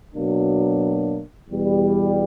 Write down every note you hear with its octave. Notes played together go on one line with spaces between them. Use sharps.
B2 F#3 A#3 D4
E2 B2 G3